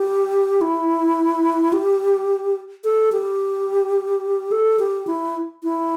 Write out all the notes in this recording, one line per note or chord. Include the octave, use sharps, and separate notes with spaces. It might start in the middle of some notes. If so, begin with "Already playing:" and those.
Already playing: G4
E4
G4
A4
G4
A4
G4
E4
E4